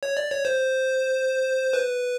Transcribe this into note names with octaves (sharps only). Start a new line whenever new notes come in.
C#5
D5
C#5
C5
B4